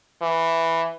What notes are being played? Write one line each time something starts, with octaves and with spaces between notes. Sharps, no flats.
E3